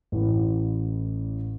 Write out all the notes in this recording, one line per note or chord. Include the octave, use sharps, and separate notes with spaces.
A1 A2 E3